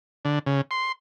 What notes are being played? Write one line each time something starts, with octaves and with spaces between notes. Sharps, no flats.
D3
C#3
C6